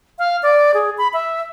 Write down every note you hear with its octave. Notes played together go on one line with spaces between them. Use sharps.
F5
D5
G#4
B5
E5